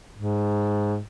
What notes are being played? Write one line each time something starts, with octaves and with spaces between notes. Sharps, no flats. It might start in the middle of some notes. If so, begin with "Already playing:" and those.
G#2